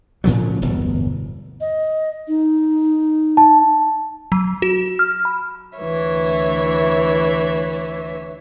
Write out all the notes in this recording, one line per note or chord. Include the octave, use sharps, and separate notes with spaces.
A2 C#3 F3 F#3
D1 G1 E2 B2
D#5
D#4
A5
F#3
F#4
F6
B5
D2 E3 C#5 E5